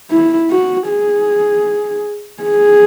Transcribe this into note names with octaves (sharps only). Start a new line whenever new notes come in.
E4
F#4
G#4
G#4